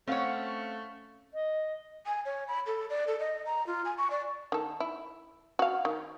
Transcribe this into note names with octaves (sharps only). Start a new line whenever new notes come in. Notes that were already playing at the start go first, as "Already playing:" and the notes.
A3 C4 C#4 C#5 F5 F#5
D#5
G#5
C#5
B5
A4
D5
A4
D#5
A#5
F4
G#5
C#6
D5
D#3 A4
E4
F#4 F5
D#3